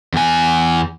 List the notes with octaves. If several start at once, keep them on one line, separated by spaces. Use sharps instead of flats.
E2 G#5